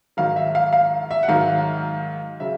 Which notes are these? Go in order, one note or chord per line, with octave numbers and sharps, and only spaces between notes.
G#2 D#3 F#3 F5
E5
F5
F5
E5
F#5
G#2 D#3 F#3 F5
C#3 F#3 E5